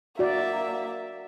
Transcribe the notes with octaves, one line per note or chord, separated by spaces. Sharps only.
A#3 F#4 D5 E5